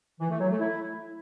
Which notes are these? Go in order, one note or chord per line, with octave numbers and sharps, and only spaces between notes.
E3
A3
F#3
A3
E4